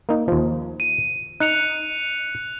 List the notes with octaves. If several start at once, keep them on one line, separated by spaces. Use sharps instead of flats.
A#3 D#4
D#2 F3
D#7
D#4 F#6 C#7 F7